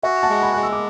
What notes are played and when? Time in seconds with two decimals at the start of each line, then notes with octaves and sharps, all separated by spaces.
0.03 F#4 E5 G#5
0.23 F#5 A5
0.30 G#3
0.42 G#5 B5
0.53 G#3 F#6
0.63 E6
0.72 D6